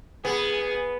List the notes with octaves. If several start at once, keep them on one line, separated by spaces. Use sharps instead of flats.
B3 G#4